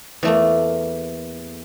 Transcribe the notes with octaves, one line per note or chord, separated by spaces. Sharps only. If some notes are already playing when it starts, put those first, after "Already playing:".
E2 A3 A#3